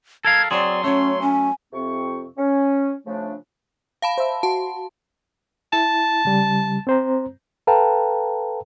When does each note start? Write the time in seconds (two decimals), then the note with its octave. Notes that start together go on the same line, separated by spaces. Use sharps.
0.25 A4 A#4 F5 G#6
0.51 F#3 C4 G#4 D5 C6
0.84 F#3 A3 C#4 C#5
1.21 C#4 G#5
1.73 F2 C3 C4 C#6
2.37 C#4
3.06 C#3 F3 A3 D4
4.02 F5 A5 B5
4.18 C5 E5
4.43 F#4 A5 C6
5.73 E4 A5
6.25 C#3 G3
6.87 C4 C5 A#5
7.67 A4 B4 F5 G5 A5 A#5